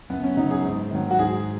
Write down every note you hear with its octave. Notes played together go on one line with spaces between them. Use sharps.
F#2 B3
C#4
C#3 F#3 D#4
G#4
G#2
D#3 F#3
F#4
G#2 G#4